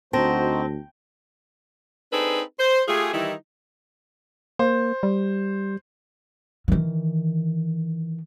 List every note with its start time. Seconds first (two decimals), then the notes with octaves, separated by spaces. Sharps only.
0.13 D2 C4 D#4 F#4 C5 A5 A#6
2.12 C4 D4 D#4 G#4 A4 B4
2.59 C5
2.88 A3 F4 G4 G#4
3.13 D#3 E3 G3 D#4 E4
4.59 A#3 C5
5.03 G3
6.68 D#3 E3